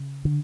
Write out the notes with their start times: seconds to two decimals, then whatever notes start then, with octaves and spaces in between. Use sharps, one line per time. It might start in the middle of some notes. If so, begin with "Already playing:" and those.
Already playing: C#3
0.25 D3